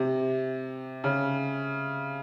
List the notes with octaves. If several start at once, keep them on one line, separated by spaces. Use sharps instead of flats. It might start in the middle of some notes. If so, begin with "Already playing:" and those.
Already playing: C3
C#3